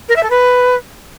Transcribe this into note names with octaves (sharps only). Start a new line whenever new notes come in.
A#4
E5
A4
B4